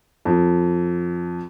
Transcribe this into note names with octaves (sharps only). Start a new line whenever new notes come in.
F2